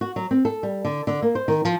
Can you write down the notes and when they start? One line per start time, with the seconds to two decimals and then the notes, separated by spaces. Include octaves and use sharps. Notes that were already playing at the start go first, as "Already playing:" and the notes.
0.01 F#4
0.16 F#3
0.31 C4
0.45 A4
0.63 G3
0.85 D3
1.07 D3
1.22 A#3
1.35 C5
1.48 D#3
1.65 F3